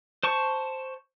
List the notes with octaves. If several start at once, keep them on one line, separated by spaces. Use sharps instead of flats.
C5 A5 C#6